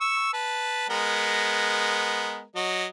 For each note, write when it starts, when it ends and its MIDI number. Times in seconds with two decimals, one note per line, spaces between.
0.01 0.28 85
0.01 0.28 88
0.33 0.89 71
0.33 0.89 81
0.89 2.43 56
0.89 2.43 59
0.89 2.43 70
2.56 2.86 54
2.56 2.86 75